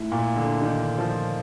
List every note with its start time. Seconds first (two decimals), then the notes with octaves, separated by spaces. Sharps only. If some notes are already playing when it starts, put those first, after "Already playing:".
Already playing: A2
0.12 A#2
0.36 D3
0.62 D#3
0.98 F3